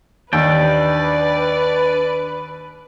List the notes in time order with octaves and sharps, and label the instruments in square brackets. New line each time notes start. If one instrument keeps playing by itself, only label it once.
[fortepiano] D#2 [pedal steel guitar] D4 G5 [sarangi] B4 [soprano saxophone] D5